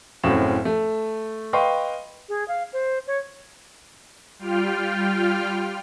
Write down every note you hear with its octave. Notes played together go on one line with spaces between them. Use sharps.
F#1 A2 C4 C#4 F#4 E7
A3
B4 D#5 F5 G5 C6 C#6
G#4
F5
C5
C#5
G3 F4 G5 F6